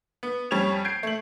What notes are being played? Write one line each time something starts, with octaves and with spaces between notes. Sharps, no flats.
B3
F2 G3 C#4 C#6 G#6 F7
G6 G#6 C7 D7
A3 F#7